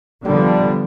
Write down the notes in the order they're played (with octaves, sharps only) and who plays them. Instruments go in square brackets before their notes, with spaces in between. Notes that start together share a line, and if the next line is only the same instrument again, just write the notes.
[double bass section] D3 F3 B3 [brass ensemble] G3 D4